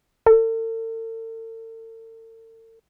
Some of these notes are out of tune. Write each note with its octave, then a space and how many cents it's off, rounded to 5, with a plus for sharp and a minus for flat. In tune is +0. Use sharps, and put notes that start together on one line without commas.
A4 +45